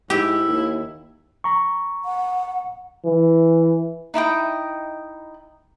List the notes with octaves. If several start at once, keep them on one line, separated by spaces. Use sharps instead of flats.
G#2 E4 G4
D#2
A#5 C#6
F#5
E3
D#4 E4 D#5 G5